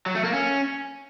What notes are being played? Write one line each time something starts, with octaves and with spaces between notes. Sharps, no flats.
F#3
A3
A#3
C#4